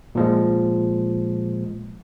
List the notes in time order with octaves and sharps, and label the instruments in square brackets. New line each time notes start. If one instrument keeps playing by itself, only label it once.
[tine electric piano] A#2 F3 G#3